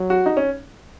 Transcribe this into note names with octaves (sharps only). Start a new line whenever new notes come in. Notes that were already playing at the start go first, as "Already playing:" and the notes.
Already playing: F#3
F#4
D#4
C#4